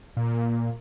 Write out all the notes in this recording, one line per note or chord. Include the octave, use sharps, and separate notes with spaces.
A#2